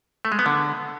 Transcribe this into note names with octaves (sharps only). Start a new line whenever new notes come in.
A3
G#3
B3
D3